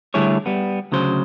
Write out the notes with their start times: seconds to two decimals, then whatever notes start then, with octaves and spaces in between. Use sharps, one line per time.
0.14 D3 G3 A3 E4 G#4 C#5
0.46 G3 B3
0.92 D2 C#3 F#3 C5